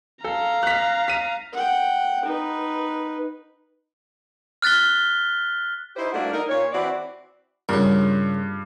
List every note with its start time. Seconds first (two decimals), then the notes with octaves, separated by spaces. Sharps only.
0.24 A4 F5 A#5
0.63 F#6 B6
1.08 B6 D#7
1.53 F#5 G5
2.25 D#4 B4
4.62 F6 F#6 A6 B6 G7
5.96 D#4 E4 G4 C5
6.12 G2 A3 A#3 D4 E4 F#4
6.31 D#4 A#4
6.49 A#2 C#5
6.72 E3 C4 F#4 B4 D5
7.69 G2 A#2 C#3